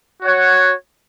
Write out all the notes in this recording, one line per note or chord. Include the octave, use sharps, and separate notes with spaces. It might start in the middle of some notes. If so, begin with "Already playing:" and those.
F#4 C#5 F#5